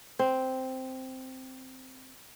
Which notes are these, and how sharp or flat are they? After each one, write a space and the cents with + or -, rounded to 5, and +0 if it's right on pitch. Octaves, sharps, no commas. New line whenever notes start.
C4 -5